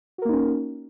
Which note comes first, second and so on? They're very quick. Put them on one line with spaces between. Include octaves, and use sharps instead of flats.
F#4 A#4 A#3 D#4 C#4